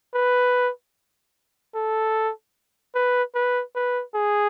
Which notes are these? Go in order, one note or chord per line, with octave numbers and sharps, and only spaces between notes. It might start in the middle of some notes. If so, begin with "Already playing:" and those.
B4
A4
B4
B4
B4
G#4